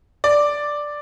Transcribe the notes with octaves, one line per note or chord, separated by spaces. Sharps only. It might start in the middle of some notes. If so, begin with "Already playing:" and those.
D5